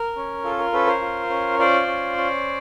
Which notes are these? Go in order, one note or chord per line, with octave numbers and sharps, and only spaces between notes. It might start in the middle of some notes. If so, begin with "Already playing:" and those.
Already playing: A#4
C#4
F4 A4
A#4
C#4 A4 B4
A#4 C5
F4
C#4
F4 C5 D5
C#4
C#4